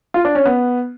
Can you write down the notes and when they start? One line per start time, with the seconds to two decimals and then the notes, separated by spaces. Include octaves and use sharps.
0.14 F4
0.25 D4
0.35 C#4
0.46 B3